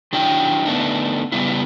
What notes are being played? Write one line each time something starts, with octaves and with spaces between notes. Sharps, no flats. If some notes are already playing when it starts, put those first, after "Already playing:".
D#3 F#3 D4 E4 G5
D3 A3 B3 D4 D#4
C#3 G3 B3 E4